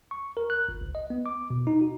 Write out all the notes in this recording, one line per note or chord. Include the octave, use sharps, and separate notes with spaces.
C#6
A#4
F#6
G1
C#2
D#5
B3
D6
B2
D#4
F#4